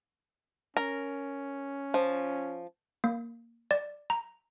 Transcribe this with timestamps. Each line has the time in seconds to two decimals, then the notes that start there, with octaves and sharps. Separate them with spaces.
0.77 C#4 A#4
1.94 F3
3.04 A#3
3.71 D5
4.10 A#5